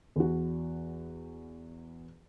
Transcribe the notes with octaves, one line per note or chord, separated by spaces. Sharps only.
E2 F#4